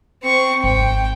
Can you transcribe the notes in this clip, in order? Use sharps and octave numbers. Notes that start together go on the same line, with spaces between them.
C4 C#6
G#1 G5